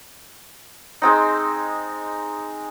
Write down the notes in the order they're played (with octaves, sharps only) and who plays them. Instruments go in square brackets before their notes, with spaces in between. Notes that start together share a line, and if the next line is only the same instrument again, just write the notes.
[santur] G#3 C4 D#4